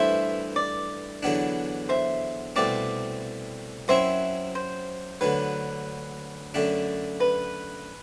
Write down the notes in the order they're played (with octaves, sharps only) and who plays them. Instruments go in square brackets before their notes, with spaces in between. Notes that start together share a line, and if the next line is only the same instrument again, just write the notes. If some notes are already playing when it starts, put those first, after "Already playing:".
Already playing: [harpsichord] G2 E3 A3 E4 [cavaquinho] C5 E5
[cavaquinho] D5
[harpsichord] E2 D3 F#3 B3 D4
[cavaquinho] C5 E5
[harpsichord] C2 B2 A3 C4 [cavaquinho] D5
[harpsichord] F#2 F#3 C4 E4 [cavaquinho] C5 E5
[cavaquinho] C5
[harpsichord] D2 D3 F#3 [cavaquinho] B4
[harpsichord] F#2 D3 A3 D4
[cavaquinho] B4